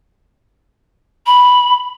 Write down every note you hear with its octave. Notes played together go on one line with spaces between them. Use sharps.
B5